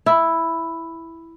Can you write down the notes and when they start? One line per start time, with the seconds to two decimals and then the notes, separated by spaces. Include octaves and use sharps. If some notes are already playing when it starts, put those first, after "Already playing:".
0.06 E4